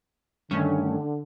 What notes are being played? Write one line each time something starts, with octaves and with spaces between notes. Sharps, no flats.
G2 D3 D#3 A3 C#4